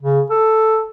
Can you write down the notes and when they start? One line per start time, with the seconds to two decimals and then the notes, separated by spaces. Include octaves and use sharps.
0.02 C#3
0.30 A4